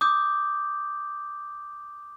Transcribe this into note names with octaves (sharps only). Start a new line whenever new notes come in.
D6 D#6 G6